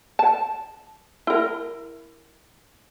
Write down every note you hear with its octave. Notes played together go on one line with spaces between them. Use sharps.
A5
E4 A#4